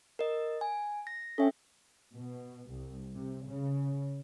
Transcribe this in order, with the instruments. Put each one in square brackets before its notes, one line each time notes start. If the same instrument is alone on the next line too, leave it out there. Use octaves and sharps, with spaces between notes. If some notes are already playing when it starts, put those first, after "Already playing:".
[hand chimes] A#4 D#5
G#5
A#6
[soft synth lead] C#4 [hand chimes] A4 E5 G5
[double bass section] B2
C2
C3
C#3